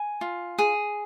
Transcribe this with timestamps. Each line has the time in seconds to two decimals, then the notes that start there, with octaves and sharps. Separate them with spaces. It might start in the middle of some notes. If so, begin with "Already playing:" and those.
Already playing: G#5
0.21 F4
0.58 G#4